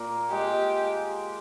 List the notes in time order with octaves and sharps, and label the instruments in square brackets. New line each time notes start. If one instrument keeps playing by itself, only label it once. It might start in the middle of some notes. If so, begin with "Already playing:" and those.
Already playing: [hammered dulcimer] A#2 A#3
[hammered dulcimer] G#3 [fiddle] G4